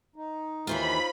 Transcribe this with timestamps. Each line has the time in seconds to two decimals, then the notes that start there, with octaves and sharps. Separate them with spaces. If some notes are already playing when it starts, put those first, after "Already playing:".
0.16 D#4
0.67 D#2 E3 F4 C5 C#5 B5